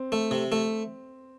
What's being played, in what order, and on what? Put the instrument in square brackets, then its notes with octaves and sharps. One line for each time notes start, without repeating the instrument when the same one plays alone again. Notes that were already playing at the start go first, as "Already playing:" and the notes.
Already playing: [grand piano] C4
[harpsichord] A3
C3
A3